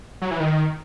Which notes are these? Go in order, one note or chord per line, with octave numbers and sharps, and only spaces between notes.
F#3
E3
D#3